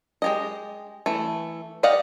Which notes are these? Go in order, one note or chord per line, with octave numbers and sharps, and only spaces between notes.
G#3 G4 D#5
E3 A3
G4 D5 D#5 F5 F#5